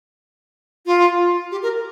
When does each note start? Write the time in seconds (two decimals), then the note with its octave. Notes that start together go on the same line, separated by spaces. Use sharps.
0.86 F4
1.52 G4
1.63 A#4